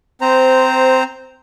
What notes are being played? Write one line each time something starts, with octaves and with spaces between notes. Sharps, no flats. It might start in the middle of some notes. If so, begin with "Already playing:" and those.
C4 C5 A#5